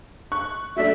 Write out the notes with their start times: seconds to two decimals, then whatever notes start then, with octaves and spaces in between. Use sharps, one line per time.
0.32 C#6 F#6
0.76 F#3 A3 D4 E5